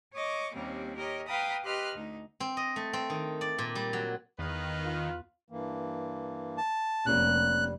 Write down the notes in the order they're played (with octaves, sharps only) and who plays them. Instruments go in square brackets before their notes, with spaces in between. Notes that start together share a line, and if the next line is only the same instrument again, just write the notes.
[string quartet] C#5 D#5 C#6 D6
D#2 G3 A#3 C4 C#4
G4 A#4 C#5 D#5
B4 F5 G5 A#5 B5 D#6
G4 B4 D#5 C6 F6 F#6
D2 D#4
[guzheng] C4
D#5
A3
C4
D#3
D5
A#2
G3
F#3
[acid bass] E2 [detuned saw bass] D#3 [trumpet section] B4 D#5 F5
[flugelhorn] F4
[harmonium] G2 E3 A#3
[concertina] A5
[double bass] F1 [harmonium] G3 [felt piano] A#3 B3 C#4 [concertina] F#6